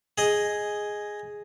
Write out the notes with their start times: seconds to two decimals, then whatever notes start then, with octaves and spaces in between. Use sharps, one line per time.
0.18 G#4 D#5